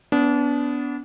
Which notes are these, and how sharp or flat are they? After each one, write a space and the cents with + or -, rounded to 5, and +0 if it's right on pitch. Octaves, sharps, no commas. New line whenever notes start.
B3 +5 D4 -30